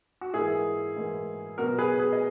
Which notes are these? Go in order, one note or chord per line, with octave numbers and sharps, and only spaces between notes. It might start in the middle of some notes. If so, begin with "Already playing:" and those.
F#4
G#2 E3 A#3 E4 G#4
G#2 E3 A#3
B2 F#3 B3 F#4 A#4
G#4 B4
G#4 B4
D#5